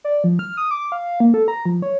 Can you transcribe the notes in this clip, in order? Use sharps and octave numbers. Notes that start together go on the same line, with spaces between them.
D5
F3
F6
D#6
D6
F5
A#3
A4
A#5
F3
C#5